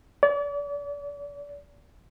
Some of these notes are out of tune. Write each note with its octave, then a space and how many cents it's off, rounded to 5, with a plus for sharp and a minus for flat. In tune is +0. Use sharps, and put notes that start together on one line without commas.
D5 -40